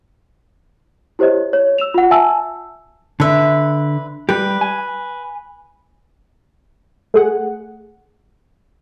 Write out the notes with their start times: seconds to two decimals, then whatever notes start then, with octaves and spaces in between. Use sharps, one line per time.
1.19 E4 G4 C5 C#5 D#5
1.53 C#5
1.78 E6 E7 F7
1.94 F4 F#5
2.11 E5 G#5 A5 E6
3.20 D3 B4 E5
4.29 G3 G4 B4
4.61 G#5
7.14 A3 G#4 F#5